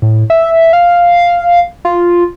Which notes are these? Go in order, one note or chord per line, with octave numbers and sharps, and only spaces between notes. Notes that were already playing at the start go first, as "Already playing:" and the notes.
A2
E5
F5
F4